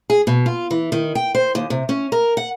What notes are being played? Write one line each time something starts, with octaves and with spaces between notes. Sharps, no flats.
G#4
B2
F4
E3
D#3
G5
C5
D#2
C3
C#4
A#4
F#5